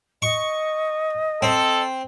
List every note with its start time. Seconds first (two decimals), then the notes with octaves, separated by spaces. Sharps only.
0.22 D#5 C#6
1.42 C4 A4